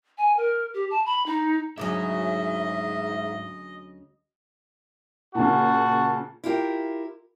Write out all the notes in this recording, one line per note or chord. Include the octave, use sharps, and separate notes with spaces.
G#5
A#4
G4
A5
B5
D#4
D2 G#2 C#3 F#3 D#5 E5
A#2 C#3 F#4 A5
E4 F4 G4 A#4